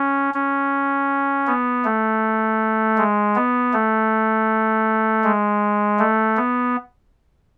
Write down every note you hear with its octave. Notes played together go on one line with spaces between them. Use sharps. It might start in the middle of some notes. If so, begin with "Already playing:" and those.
Already playing: C#4
C#4
B3
A3
G#3
B3
A3
G#3
A3
B3